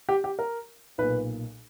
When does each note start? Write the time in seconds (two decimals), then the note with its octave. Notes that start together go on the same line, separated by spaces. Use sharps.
0.09 G4
0.24 G4
0.39 A#4
0.98 B1 A#2 B4